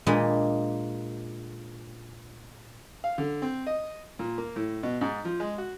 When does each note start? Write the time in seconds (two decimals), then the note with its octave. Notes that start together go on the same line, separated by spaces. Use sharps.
0.07 A#2 G#3 D4 D#5 B5
3.04 F5
3.18 D3
3.42 C4
3.67 D#5
4.19 A#2
4.38 A#3
4.56 A2
4.83 B2
5.01 G#2
5.25 F3
5.40 G#3
5.58 F#4